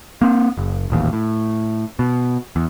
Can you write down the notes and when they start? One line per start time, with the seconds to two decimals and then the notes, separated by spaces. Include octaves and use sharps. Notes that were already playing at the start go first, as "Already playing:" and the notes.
0.21 A#3 C4
0.58 F#1
0.90 D#1 A1 D#2
1.13 A2
1.99 B2
2.56 E2